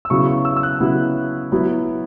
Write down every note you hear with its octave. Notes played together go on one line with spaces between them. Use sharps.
E6
C#3 F#3 B3 E4 C#6
C#6
E6
E6
F#6
C#3 F#3 B3 E4
F#3 B3 E4